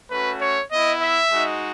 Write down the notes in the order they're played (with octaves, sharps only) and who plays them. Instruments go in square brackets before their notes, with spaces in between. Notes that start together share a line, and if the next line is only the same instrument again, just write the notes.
[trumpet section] A3 C#4 F#4 B4
C#5
B3 E4 D#5
E5
G#3 D#4 F#4